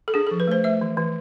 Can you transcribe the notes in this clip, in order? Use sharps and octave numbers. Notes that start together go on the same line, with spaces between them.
A4
D4 G#4
F3 A4
B4
A3 C5
A3 E5
E3
E3